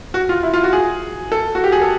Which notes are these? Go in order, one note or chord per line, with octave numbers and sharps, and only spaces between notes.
F#4
F4
E4
F4
F#4
G#4
A4
F#4
G4
G#4
A4